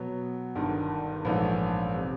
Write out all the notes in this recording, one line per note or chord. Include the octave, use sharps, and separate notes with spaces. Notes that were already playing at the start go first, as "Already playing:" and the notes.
Already playing: B2 F#3 B3
G1 G2 D#3
A#1 G#2 E3 A3 C#4
C3